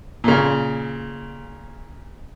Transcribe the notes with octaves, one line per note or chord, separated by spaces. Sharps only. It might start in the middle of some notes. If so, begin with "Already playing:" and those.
A#2 C#3